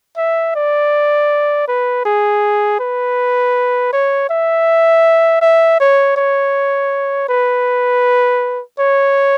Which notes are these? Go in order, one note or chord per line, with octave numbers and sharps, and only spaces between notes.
E5
D5
B4
G#4
B4
C#5
E5
E5
C#5
C#5
B4
C#5